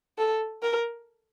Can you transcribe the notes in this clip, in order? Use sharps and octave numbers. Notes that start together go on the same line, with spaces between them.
A4
A#4